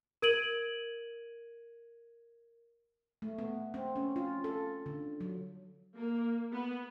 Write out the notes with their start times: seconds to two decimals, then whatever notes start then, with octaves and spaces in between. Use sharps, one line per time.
0.22 A#4 G#6 D7 D#7 F#7
3.22 A3
3.38 B3
3.74 C4
3.96 C#4
4.16 F4
4.44 A4
4.86 D3
5.21 F#3
5.96 A#3
6.52 B3